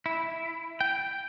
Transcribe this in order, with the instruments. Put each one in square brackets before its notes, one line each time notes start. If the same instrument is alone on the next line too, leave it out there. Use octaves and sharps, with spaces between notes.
[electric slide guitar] E4
G5